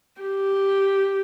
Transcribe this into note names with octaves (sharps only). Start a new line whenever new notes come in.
G4